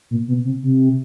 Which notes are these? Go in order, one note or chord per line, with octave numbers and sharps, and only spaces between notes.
A#2
B2
C3
C3